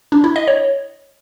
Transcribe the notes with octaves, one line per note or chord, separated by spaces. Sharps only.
D4
E4
D#5
C#5